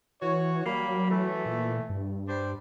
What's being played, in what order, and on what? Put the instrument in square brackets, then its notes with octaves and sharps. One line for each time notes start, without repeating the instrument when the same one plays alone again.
[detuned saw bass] E3 [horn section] F#4 C#5
[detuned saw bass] F#3 [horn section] G3 A#3 B5
[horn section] E3 A3
[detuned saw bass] A#2
G2
[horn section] G3 D4 C5